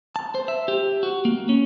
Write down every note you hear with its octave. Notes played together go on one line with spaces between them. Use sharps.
A5
C5
E5
G4
F#4
A#3
C#4